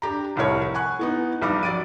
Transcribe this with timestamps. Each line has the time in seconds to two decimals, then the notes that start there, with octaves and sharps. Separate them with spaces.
0.02 D4 G4 A#5
0.36 F1 C2 A2 A#4 C#5
0.74 F#5 G#5 C#6 F#6
0.99 E3 B3 D#4
1.42 A#1 G3 D#4 F5 D6
1.63 F#2 D5 A6 D7 D#7